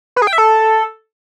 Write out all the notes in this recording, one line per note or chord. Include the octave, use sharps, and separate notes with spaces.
B4
G#4
G5
E5
A4